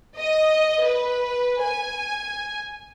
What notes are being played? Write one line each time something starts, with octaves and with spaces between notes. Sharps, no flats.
D#5
B4
G#5